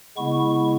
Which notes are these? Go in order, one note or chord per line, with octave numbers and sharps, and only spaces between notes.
C#3 G#3 B3 E4 C#6